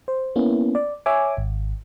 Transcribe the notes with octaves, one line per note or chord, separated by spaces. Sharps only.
C5
A#3 B3 C#4 E4
D5
C#5 E5 G#5 D6
G#1